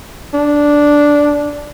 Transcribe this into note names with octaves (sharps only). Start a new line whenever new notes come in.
D4